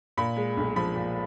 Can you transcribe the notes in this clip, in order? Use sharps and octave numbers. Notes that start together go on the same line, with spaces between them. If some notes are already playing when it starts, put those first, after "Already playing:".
A#2 B5
G#3
B1
F3 B5
A#2